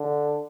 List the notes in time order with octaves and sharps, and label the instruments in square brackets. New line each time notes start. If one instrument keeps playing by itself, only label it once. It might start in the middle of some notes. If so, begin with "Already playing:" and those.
Already playing: [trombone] D3